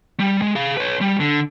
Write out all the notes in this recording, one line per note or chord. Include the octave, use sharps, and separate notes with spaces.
G3
G#3
G#4 F5
B4 C#5
G3
D3